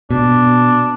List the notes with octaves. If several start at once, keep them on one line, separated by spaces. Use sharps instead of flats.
B2 D4